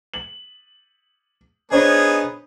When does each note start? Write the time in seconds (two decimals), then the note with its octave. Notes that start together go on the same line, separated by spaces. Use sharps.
0.14 F#7
1.72 B3 D4 D#4 G#4 C5 C#5